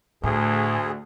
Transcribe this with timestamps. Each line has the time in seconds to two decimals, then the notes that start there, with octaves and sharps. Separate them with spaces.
0.23 D2 A2 G#4